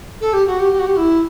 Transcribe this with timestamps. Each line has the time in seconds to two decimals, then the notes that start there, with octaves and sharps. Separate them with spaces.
0.20 A4
0.33 G4
0.46 F#4
0.58 G4
0.72 G4
0.79 F#4
0.85 G4
0.96 E4